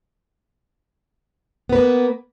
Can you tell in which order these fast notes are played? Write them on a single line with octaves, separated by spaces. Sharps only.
B3 B4 A#3